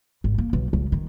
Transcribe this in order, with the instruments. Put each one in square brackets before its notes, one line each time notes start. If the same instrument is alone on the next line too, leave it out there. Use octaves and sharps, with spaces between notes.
[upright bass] G#1
A#3
B1
C#2
D#3